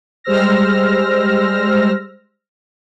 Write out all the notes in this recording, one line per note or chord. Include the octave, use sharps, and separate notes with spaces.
G3 G#3 C5 E6 F6 A#6